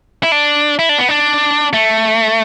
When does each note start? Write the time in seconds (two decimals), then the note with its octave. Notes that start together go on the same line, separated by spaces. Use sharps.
0.23 E4
0.32 D4
0.79 E4
0.89 D4
0.99 B3
1.09 D4
1.73 A3